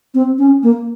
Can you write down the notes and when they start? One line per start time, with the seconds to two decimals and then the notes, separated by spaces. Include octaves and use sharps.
0.14 C4
0.38 C#4
0.63 A#3